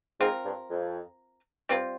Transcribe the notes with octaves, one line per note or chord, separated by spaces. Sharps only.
G#2 C4 F4 A#4
G2
F2
G2 G3 C4 F4